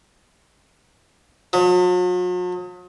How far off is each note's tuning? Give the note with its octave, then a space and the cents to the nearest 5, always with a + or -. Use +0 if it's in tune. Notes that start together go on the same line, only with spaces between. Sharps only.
F#3 -45